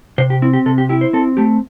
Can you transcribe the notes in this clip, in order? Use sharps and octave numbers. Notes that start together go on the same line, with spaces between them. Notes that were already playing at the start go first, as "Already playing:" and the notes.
C3 C5
G4
C4 E4
G4
C3 A4
G4
E4 G4
C5
C4 A4
A3 G4